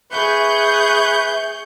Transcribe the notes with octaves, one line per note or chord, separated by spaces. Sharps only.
G#4 B4 E5 C#6 G6